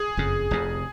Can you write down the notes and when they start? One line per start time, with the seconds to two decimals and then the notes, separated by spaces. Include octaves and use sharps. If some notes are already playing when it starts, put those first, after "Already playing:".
Already playing: G#4
0.17 F#1 F2 C#3
0.51 F1 F2 C3